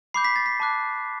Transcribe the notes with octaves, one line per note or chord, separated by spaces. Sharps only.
B5 D6 G6 C7
B6
A6
B6
A5 D6 F#6